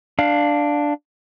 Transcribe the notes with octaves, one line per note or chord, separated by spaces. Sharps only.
D4 F5